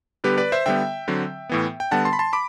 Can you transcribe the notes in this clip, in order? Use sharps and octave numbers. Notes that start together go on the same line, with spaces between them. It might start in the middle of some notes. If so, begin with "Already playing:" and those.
D3 G3 B3 G4 B4
B4 D5
C5 E5
D3 G3 B3 E5 G5
D3 F#3 C4
A2 E3 B3
G5
D3 G3 B3 F#5 A5
A5 C6
B5
A5 C6
B5 D6